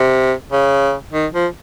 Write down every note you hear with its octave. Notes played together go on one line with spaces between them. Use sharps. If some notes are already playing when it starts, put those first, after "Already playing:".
Already playing: C3
C#3
D#3
F3